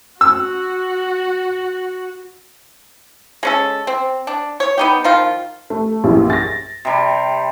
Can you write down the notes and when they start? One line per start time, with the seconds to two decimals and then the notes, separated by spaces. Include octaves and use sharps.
0.21 F#4 E6
3.43 G#3 C#4 A4
3.87 C4
4.27 D4
4.60 C#5
4.78 B3 D#4 G4
5.04 D#3 F3 F4
5.70 A3
6.04 A#1 F#2 E3
6.30 A6 A#6
6.85 C3 G3